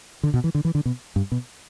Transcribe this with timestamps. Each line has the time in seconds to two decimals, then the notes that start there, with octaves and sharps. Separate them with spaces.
0.23 D3
0.34 B2
0.44 E3
0.55 D3
0.65 E3
0.75 D3
0.85 B2
1.16 G2
1.32 B2